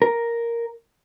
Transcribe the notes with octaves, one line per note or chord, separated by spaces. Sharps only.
A#4